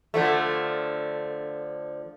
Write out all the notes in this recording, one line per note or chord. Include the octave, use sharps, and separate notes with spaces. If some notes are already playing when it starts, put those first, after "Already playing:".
D3 F3 A3